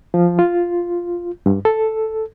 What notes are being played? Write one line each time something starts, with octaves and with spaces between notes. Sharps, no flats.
F3
F4
G2
A4